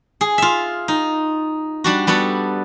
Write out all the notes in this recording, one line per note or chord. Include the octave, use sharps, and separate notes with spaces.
G#4
F4 E5
D#4
G3 D4 F#4
G3 B3 F#4 A4